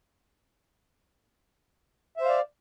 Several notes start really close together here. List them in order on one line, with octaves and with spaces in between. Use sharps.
E5 C5 F5 D5